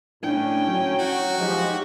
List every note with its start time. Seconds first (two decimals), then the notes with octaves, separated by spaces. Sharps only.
0.23 A2 C#4 D4 G5
0.66 F#3
0.99 F#4
1.39 F3 G#3 D#4 G4